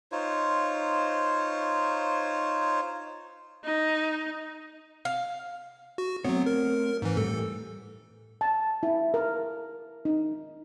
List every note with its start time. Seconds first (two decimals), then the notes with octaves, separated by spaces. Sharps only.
0.12 D#4 F4 C5 C#5
3.64 D#4
5.05 F5
5.98 F#4
6.24 F#3 A3 B3 C4 C#5
6.46 A#4
7.02 G#2 E3
7.17 A2 G3 A4
8.41 A5
8.83 E4
9.14 A#4
10.05 D#4